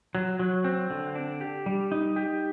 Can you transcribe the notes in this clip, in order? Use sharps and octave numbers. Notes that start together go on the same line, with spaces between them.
F#3
F#3
C4
D3
D4
G4
G3
D#4
G4